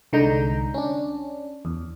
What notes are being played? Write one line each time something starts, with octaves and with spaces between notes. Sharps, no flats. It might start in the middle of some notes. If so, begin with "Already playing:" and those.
C2 D3 G#3 D#4 A#5 G6
C#4 D4
E2